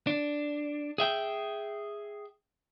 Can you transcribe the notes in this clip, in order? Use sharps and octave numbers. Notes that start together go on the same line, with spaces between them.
D4
G#4 E5 G5